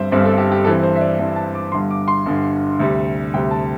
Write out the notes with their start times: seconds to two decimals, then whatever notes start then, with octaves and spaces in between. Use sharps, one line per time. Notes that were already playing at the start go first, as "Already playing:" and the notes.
Already playing: G1 G2 G3 C4 C5 E5
0.12 G1 G2 G3 C4
0.25 A4
0.38 G4
0.51 G4
0.65 G2 E3 C4 A4
0.83 C5
0.96 E5
1.01 D5
1.19 G2 E3 C4 E5
1.36 A5
1.55 D6
1.72 G1 G2 D3 C6
1.91 D6
2.08 C6
2.26 G1 G2 D3
2.80 D2 C3 G3
3.34 D2 C3 G3 G5
3.51 A5